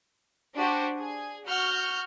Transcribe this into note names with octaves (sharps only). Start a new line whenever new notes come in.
D4 F#4 G4 C5
G#4
F#4 F6 G6